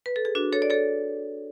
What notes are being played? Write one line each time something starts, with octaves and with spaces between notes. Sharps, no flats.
B4
A4
G#4
D4 F#4
A4 C#5
D5
A4 C#5